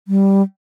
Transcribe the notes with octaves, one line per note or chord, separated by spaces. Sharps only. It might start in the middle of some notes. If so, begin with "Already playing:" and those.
G3